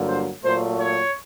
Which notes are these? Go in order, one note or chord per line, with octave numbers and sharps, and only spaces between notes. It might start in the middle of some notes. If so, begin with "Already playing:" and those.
Already playing: G1 G2 D3 F#3 A#3
C5
A#2 F#3 A3 C5
C#5